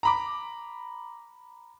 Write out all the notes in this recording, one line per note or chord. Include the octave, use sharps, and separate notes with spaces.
A#5 B5 D6